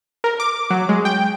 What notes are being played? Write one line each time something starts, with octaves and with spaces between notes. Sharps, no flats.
A#4
D6
F#3
G#3
G5